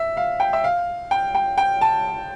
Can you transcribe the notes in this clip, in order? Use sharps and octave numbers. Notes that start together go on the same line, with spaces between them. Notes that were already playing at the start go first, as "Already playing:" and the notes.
Already playing: E5
F5
G5
E5
F5
G5
G5
G5
A5